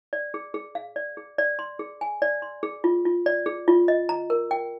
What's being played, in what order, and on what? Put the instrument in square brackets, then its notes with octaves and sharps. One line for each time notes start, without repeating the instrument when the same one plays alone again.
[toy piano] D5
G#4
G#4
F5
D5
G#4
D5
C6
G#4
G#5
D5
C6
G#4
F4
F4
D5
G#4
F4
D#5
A#5
A#4
G5